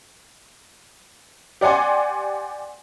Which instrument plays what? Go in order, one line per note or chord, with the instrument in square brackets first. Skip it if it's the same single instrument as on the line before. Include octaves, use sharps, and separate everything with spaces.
[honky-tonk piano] G4 D5 F#5 G#5 C6